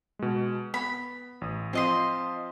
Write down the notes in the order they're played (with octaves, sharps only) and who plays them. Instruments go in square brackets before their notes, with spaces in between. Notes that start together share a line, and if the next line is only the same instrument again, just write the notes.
[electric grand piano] B2 G#3
[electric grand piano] B3 [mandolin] B5
[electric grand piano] A1 D#6
[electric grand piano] F3 C4 [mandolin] F4 D#5 C6